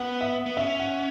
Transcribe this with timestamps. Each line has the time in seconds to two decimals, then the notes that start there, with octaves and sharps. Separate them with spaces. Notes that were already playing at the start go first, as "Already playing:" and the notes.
Already playing: B3 F#5
0.21 E5
0.46 B3
0.57 C#4 E5
0.80 F#5